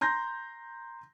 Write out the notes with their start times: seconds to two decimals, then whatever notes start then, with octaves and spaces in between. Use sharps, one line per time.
0.01 A#5 C6 G6 A#6